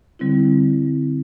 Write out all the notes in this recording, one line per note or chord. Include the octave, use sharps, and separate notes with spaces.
D3 G3 C4 E4